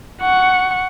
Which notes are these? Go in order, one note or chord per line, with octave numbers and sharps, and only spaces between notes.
F#5 C#6